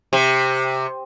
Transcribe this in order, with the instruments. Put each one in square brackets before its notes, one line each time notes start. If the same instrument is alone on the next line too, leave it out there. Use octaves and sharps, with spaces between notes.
[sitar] C3